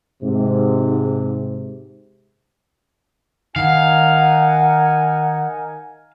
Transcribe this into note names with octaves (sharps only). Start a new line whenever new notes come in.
G#2 C3
D#3 D#4 A#4 F5 F#5 G#5